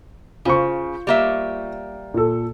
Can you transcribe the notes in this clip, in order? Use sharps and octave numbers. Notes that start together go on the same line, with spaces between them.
C#3 F4 C5 C#6
G3 A#3 E5
A#2 A4